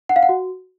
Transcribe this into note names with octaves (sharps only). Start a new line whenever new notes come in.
F#5
F5
F#5
F#4